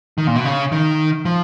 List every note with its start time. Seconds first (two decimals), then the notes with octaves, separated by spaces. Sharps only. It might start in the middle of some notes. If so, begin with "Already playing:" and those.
0.18 D#3
0.27 A#2
0.36 B2
0.45 C#3
0.72 D#3
1.25 F3